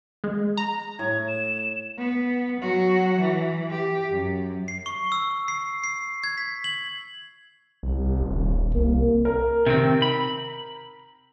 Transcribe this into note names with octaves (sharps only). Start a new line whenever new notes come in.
G#3
A#5
A2 G#6
E7
B3
F#3 F#4
E3
G4
F#2
C7
C#6
E6
C7
C7
G#6
B6
F#7
C2
D#1
C2 A#3
A#4
C3 D#3 C4
B5